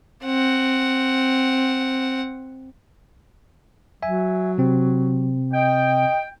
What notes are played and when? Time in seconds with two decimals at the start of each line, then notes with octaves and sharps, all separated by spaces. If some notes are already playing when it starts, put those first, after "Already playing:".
0.24 C4 F#5
4.03 F#3 E5 G#5
4.58 C3 C4
5.53 D#5 G5